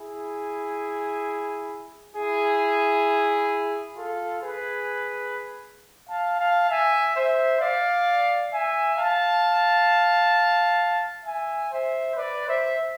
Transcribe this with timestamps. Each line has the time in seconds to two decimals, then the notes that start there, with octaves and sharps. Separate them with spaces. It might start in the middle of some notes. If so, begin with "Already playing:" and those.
Already playing: E4 G#4
2.14 E4 G#4
3.95 F4 A4
4.41 G#4 B4
6.08 F5 A5
6.39 F5 A5
6.69 E5 G#5
7.14 C5 E5
7.60 D5 F5
8.51 E5 G#5
8.96 F5 A5
11.24 E5 G#5
11.70 C5 E5
12.15 B4 D5
12.47 C5 E5